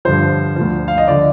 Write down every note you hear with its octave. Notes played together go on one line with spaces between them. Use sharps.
G2 D3 F3 C5
D2 D3 F3
F5
D#5
D3 F3 D5